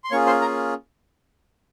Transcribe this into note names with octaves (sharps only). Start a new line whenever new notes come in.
C6
A#3 C#4 F4 G#4 C#5 C#6
C5 C6
A#4 A#5